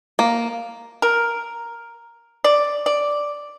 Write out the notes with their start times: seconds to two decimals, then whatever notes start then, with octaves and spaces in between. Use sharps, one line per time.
0.19 A#3
1.02 A#4
2.44 D5
2.86 D5